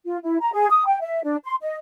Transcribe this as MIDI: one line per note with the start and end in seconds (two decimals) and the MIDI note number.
0.05 0.18 65
0.23 0.37 64
0.41 0.51 82
0.53 0.66 68
0.70 0.86 87
0.87 0.98 79
1.01 1.22 76
1.23 1.36 62
1.45 1.55 84
1.62 1.76 75